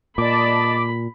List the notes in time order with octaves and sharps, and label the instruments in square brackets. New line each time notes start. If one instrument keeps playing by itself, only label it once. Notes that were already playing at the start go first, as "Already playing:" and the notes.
[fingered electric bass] A#2 [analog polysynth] D5 D#5 A5 [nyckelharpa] B5 [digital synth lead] D6